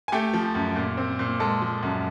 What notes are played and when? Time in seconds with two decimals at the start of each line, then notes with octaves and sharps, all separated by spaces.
0.08 G#5
0.12 A3 G4 G5
0.33 F3
0.55 F#2
0.76 A#2
0.97 C4
1.19 A#2
1.40 G#3 A4 A5
1.61 F3
1.83 F#2